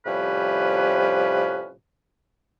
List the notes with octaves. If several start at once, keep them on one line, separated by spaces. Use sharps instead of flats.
A2 C3 F3 G3 C#4 B4